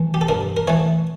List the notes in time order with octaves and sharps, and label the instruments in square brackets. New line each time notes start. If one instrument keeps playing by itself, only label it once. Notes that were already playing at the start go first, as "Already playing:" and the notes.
Already playing: [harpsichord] E3 A3
G4
A4
G2 A#4
A#4
E3 A3 C#5